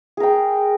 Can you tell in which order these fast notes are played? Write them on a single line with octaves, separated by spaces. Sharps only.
G#4 A#4 G5